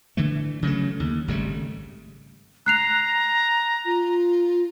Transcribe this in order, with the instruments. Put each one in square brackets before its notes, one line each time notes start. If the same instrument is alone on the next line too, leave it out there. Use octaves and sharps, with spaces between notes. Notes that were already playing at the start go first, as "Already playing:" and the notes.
[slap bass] D3 E3 A3
C#3 F#3 G#3 A3
D#2
G#1 C#3 G3 A3
[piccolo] A#5 [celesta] F#6 C7 F7
[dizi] F4